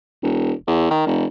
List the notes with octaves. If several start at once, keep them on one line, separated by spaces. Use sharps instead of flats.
E1
E2
D#3
F1